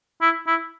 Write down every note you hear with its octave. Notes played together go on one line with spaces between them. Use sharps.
E4
E4